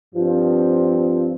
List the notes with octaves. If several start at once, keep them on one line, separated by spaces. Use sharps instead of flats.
G2 F3 C4